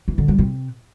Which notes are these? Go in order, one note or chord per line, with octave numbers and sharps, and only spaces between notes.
E3
D3
G3
C3